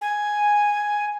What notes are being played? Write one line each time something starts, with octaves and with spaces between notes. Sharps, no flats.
G#5